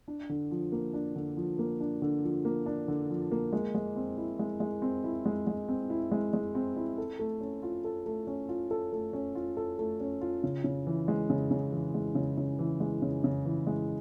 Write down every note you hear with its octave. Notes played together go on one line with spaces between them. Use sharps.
D4
D3
F3
A#3
D4
D3
F3
A#3
D4
D3
F3
A#3
D4
D3
F3
A#3
G#3
G#3
C4
E4
G#3
G#3
C4
E4
G#3
G#3
C4
E4
G#3
G#3
C4
E4
A4
A3
C#4
F4
A4
A3
C#4
F4
A4
A3
C#4
F4
A4
A3
C#4
F4
C#3
C#3
E3
G#3
C#3
C#3
E3
G#3
C#3
C#3
E3
G#3
C#3
C#3
E3
G#3